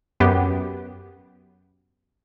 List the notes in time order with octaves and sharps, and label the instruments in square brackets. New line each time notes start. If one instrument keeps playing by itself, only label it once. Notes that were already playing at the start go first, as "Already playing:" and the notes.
[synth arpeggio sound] F#2 B3 G4